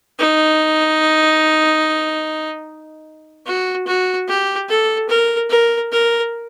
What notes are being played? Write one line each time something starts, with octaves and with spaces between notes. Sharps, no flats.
D#4
F#4
F#4
G4
A4
A#4
A#4
A#4